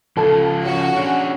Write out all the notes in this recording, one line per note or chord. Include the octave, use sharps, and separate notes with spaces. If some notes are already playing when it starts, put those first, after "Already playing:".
C#3 F3 F4 A4 A5
C#4 F#4
D4 G#4